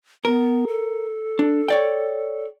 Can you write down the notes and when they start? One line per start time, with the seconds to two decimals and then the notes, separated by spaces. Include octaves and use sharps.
0.25 B3 A#4
0.68 A4
1.39 D4
1.68 C#5 D5 G5